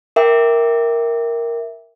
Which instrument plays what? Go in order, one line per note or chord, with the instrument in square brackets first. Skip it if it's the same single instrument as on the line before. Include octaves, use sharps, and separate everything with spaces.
[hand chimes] A#4 E5 G5 D6